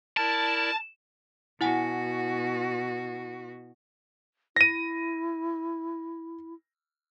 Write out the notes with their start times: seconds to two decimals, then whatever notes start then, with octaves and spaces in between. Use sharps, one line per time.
0.17 E4 A#4 D5 A5
1.61 B2 E4 F#4 F#5 G#5
4.56 E4 A#6 D#7